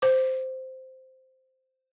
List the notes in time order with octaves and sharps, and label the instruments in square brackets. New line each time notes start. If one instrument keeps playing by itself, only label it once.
[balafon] C5 D6